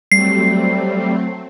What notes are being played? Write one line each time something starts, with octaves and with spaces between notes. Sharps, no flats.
F#3 G3 A3 C4 C7